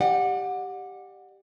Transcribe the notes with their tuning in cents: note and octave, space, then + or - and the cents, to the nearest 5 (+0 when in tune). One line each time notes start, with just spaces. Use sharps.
G4 +0 D5 +35 F#5 -25